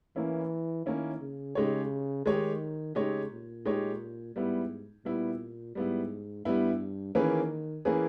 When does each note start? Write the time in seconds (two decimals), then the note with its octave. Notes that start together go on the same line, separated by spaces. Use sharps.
0.16 E3 A#3 C#4 E4
0.86 D#3 A#3 C#4 E4
1.20 C#3
1.55 C#3 G#3 D#4 G4 C#5
2.26 D#3 G#3 D#4 G4 C#5
2.95 C#3 G#3 D#4 G4 C#5
3.31 A#2
3.65 G#3 D#4 G4 C#5
4.35 G#2 G3 B3 E4
5.05 A#2 G3 B3 E4
5.75 G#2 G3 B3 E4
6.45 G2 G3 B3 E4
7.15 D#3 E3 A#3 C#4 G#4 B4
7.85 E3 A#3 C#4 G#4 B4